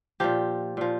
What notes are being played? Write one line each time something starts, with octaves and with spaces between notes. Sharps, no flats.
A#2 F3 G4
A#2 F3